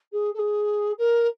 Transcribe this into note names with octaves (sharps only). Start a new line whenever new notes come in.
G#4
A4
G#4
A#4